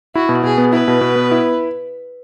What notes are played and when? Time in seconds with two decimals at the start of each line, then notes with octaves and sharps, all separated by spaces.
0.15 E4 F#4
0.29 B2
0.43 B2 G#4
0.58 B3
0.73 E4 B4
0.88 B2
1.01 B2
1.16 B3
1.31 E4